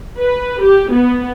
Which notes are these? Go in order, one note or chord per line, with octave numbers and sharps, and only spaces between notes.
B4
G4
B3